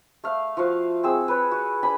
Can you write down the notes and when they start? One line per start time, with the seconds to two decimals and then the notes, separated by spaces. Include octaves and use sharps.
0.24 A3 F5
0.57 F3 F#4 F5
1.03 C4 G#4 E6
1.28 B4 C#5
1.51 F#4
1.83 D4 G#5 B5